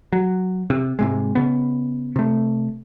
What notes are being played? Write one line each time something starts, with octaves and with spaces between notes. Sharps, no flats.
F#3
C3
G#2 C3 G#3
C#3 B3
C3 A3